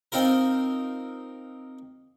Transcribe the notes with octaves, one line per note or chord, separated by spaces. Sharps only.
C4 D#4 F4 A#4